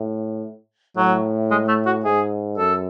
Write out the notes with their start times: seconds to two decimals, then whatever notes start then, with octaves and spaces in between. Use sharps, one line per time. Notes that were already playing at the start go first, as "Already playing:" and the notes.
Already playing: A2
0.96 A2 F#3
1.51 G#3
1.68 A3
1.86 F#4
2.04 G#2 G#4
2.57 F#2 A4